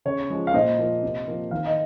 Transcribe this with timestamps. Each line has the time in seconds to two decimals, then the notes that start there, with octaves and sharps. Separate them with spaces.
0.05 C#3 C#5
0.30 F3 G#3
0.47 F5
0.54 A#2 C5 D#5
0.78 F3 A#3
1.03 C3
1.27 F3 A#3
1.51 D#3 F5
1.66 D#5